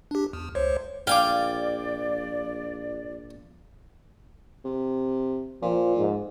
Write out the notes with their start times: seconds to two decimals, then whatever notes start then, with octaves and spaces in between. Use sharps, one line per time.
0.11 D4 G4
0.33 E2
0.55 C#2 C5 C#5
1.07 A#1 D5 F5 G5 G#5 D6
4.65 C3
5.62 A#2 F3
5.97 G#2